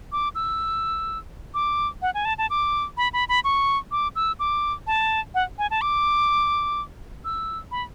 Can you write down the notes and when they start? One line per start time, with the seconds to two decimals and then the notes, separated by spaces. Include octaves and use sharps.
0.12 D6
0.35 E6
1.54 D6
2.02 F#5
2.14 G#5
2.25 A5
2.38 A5
2.50 D6
2.97 B5
3.13 B5
3.29 B5
3.44 C#6
3.91 D6
4.16 E6
4.39 D6
4.87 A5
5.35 F#5
5.58 G#5
5.71 A5
5.81 D6
7.25 E6
7.71 B5